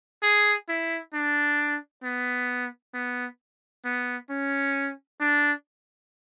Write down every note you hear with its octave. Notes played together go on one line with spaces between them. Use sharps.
G#4
E4
D4
B3
B3
B3
C#4
D4